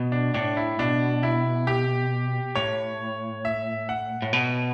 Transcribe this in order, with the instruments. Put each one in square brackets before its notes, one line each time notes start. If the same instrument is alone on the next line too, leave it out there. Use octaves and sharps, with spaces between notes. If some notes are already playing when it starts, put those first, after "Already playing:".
Already playing: [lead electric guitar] B2
[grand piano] D4
[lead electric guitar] A2 [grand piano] D4
[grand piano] E4
[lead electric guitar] B2 [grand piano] D4
[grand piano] E4
G4
[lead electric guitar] A2 [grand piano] C#5
[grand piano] E5
F#5
[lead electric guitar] A2
B2